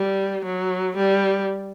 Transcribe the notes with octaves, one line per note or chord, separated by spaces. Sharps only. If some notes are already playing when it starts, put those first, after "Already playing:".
Already playing: G3
F#3
G3